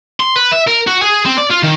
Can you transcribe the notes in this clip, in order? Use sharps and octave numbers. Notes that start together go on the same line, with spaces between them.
C6
B4
E5
A#4
F#4
G#4
C4
D5
F4
D#3